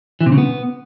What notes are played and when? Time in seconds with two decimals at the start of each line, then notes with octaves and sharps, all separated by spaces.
0.21 E3
0.26 C3
0.32 C#3
0.38 B3